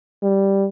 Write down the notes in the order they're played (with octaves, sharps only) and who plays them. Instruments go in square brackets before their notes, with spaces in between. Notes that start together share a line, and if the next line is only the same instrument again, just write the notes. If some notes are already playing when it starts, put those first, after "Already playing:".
[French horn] G3